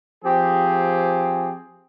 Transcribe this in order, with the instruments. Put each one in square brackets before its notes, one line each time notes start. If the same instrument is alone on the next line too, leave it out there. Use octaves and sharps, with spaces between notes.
[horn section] F3 C4 G4 G#4